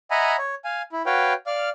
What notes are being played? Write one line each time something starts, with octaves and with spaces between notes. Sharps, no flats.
D#5 E5 F#5 G#5 A#5 B5
C#5
F5 G#5
E4
F#4 B4 C#5 F5 G5
D5 F5 F6